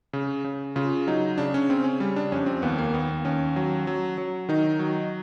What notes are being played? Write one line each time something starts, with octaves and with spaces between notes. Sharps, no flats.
C#3
C#3
C#3 F4
F#3 D#4
C#3 D4
C#4
C#3 C4
C#4
G3
D4
F2 C#4
C4
D#2 B3
A#3
D#2 B3
D#2 C#4
F#3
F#3
F#3
D#3 D#4
F#3